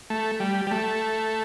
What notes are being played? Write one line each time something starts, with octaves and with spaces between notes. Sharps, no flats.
A3
G3
G3
A3